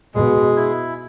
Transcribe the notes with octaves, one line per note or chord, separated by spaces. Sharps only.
B2 G#3
E4